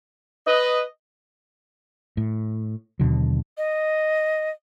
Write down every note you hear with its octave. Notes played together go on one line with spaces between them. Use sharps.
B4 D#5
A2
D#2 B2 D3 F#3
D#5